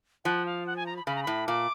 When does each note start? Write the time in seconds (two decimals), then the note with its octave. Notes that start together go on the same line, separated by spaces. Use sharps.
0.25 F3 F#5
0.46 F5
0.67 F#5
0.76 G#5
0.86 A#5
0.97 B5
1.07 C#3 B5
1.16 A#5
1.23 A2 B5
1.47 A#2 D6